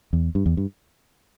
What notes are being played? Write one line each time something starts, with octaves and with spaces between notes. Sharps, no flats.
E2
G2
E2
G2